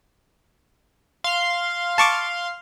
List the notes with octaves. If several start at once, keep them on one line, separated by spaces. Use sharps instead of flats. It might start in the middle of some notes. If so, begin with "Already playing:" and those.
F5 C6
A5 C#6 D6